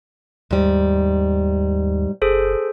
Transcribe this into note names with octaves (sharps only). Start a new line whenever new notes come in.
D#2 G#2 G3
F#1 G#4 A4 C5